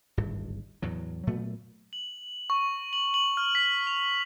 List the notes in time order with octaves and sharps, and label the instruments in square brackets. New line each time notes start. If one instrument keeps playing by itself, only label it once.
[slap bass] D1 G#1 G2
E2 A2 F#3
A#2 F#3 A3 B3
[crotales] F#7
C#6
F#7
F#7
F6
B6
F7